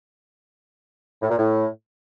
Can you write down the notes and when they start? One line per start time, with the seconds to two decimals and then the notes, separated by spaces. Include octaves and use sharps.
1.22 A2
1.30 A#2
1.39 A2